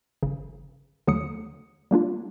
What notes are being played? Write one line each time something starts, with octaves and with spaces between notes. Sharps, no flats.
G1 C#3
D#2 D3 F#3 A3 D#6 C#7
G3 A#3 D4 F4